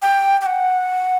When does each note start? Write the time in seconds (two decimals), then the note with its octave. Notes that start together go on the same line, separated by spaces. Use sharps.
0.02 G5
0.41 G5
0.46 F#5